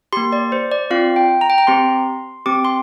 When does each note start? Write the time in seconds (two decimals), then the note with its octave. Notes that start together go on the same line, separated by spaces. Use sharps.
0.13 A#3 G4 C6
0.32 D5
0.52 C5
0.71 D5
0.90 C4 F4 F5
1.16 G5
1.41 A#5
1.50 G5
1.58 A#5
1.67 C4 G4 C6
2.46 C4 G4 D6
2.65 C6